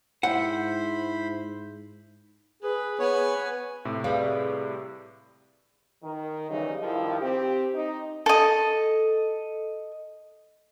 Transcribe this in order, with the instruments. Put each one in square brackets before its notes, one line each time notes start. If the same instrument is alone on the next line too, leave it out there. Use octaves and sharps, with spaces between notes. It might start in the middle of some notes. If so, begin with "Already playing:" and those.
[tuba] G#2 [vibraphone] E4 E5 [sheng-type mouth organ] C5 B5 [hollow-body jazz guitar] F#5
[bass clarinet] G#4 [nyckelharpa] B4
[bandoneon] B3 C#5 [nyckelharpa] B4 G#5
[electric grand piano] A2 C3
[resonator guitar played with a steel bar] G3 [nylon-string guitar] G#4 B4 F5
[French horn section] D#3
C#3 E3 F#3 G3 D#4
G2 D#3 F3 E4 G4
C4 G4
D#4
[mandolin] A4 D#5